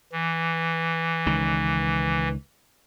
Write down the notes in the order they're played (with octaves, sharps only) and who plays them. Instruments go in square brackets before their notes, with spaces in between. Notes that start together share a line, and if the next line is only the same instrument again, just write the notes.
[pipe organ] E3
[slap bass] C#2 D#3